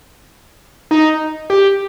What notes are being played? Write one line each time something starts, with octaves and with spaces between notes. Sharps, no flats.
D#4
G4